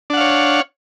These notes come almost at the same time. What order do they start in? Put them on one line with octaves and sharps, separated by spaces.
D4 F#5 F5 C#5